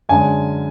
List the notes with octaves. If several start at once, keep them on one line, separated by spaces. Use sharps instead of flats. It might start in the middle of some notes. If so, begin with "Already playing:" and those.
F#2 D3 G#3 G#5